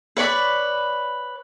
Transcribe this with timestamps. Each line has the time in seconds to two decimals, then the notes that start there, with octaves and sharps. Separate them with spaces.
0.17 B4 C#5 D5 B5